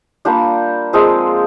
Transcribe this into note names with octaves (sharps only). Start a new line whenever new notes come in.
G3 A#3 D4 F4 G4
F3 G#3 C4 F4 G#4